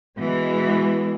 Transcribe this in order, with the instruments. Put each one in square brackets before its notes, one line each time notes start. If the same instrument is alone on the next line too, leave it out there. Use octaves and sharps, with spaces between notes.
[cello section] B2 E3 G#3